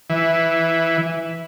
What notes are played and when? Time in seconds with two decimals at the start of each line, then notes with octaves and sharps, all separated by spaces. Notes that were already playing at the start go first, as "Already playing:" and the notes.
0.10 E3